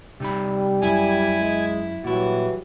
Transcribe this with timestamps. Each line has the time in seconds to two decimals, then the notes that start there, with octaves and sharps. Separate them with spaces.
0.20 C3 G3 D#4 B5
0.82 F#2 E4 G#5
1.36 G#3
2.04 A#2 E3 F#3 G3 E4 F#4